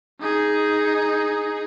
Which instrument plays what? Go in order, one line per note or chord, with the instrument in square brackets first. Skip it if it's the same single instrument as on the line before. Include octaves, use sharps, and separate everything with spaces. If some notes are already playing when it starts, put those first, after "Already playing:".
[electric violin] D#4 G#4